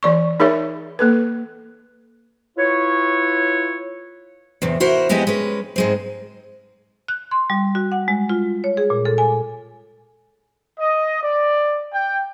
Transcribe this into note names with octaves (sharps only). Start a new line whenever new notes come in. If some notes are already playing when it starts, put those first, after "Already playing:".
E3 D5 C#6
D#4 G#4 A#4 C#5 E5
A#3 A4 B4
E4 F4 B4 C#5
E2 A2 C3
E4 F#4 A#4 C5 E5
F2 G#3 B3 E4 G4 D#5
G#3 C#4 B4
G#2 G#3 C4
F#6
C6
G3
F#4
F#5
G#3
F4
C#5
G#4
A#2
A4
G#5
D#5
D5
G5